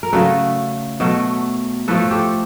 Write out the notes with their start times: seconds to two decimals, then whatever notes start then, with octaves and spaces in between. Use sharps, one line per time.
0.03 A#4
0.13 C#3 F#3 A3 A4 B4
1.00 B2 F#3 A3
1.88 A2 F3 A3 A4 B4
2.11 G4 A4